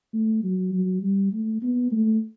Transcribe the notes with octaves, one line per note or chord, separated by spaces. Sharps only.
A3
F#3
F#3
G3
A3
B3
A3